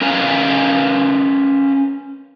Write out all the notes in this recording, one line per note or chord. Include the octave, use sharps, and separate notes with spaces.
C#4 A#4 B4 F5 G#5